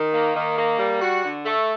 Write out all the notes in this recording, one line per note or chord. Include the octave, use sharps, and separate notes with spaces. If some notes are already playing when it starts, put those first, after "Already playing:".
Already playing: D#3
A#3
D#3
A#3
G3
F#4
D3
A3